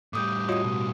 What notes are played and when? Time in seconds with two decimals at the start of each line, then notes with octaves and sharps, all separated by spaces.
0.13 A2 G3 D6 D#6 G6
0.49 F4 F#4 C#5 D#5 D#6
0.64 B2